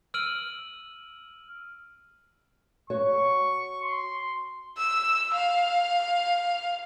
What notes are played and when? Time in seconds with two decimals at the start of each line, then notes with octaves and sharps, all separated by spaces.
0.14 E6 F6 D7 D#7 F#7
2.90 F#4 C#5 C#6
3.82 C6
4.77 E6
5.33 F5